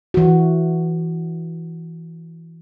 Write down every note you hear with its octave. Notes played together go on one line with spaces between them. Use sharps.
E3 F#4